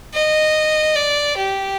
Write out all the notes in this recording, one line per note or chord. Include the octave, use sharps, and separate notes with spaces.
D#5
D5
G4